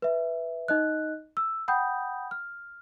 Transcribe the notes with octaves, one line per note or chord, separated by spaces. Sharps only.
B4 E5
D#4 D#5 F#6
E6
F#5 G5 B5 D#6 G6
F6